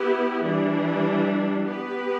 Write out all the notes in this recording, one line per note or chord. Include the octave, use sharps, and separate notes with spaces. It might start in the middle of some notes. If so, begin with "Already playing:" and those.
Already playing: B3 E4 G4 B4
E3 G3 D4
B3 G4 B4